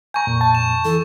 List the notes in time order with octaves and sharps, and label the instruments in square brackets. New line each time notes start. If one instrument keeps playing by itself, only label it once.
[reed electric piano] G#5 A#5 [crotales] C#6 G6
[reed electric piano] F2 A#2
[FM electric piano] A5
[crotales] E7
[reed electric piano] E3 [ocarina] A4